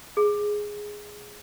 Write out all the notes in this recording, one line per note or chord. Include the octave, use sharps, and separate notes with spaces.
G#4